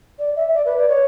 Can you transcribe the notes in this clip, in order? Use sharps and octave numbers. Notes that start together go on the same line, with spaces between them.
D5
E5
D5
B4
D5
C#5